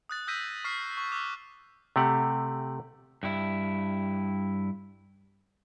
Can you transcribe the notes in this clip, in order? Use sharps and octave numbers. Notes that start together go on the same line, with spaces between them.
D#6 F#6 A6
D#6 E6 G6 A#6 B6 D#7
C#6 D#6 F6 B6 C7
C#6
D6 E6 F#6
C3 A3 G4 F#5
G2 E4